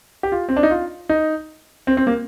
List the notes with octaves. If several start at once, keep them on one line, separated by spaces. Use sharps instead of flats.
G4
F4
C4
D4
D#4
F4
D#4
C4
C4
A#3